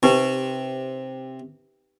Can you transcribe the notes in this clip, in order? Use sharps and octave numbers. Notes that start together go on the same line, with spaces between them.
C3 D#4 G4 B4